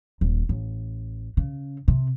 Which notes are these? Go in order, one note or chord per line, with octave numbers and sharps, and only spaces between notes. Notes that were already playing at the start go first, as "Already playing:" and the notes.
D#1
A1
C#3
C3